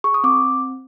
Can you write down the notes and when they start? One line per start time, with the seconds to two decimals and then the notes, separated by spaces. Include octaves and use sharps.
0.04 G#4 C#6
0.14 D#6
0.24 C4 D6